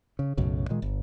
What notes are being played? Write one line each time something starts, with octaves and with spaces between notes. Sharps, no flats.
C#3
B1 F#2 A2 C#3
A#2 D#3 G#3
G1